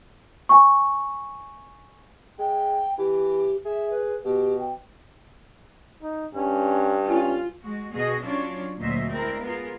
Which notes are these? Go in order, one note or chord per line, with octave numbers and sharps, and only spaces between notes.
G#5 C#6
G#3 G5
E3 G4
G#4 E5
B4
B2 G4
G5
D#4
G2 C#4
C#4 F4
G#3 F#4
B2 F#4 G#4 D#5
F#3 C#4 D4 F4 C#5
D2 A#2 F#3 C5 D#5 E5
G#3 C4 D4 E4 A#4
B3 F4 G#4 A#4